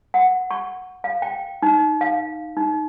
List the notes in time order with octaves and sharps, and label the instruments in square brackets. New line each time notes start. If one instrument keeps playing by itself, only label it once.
[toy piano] F#5
C#6
F5
G5
D#4
F5
D#4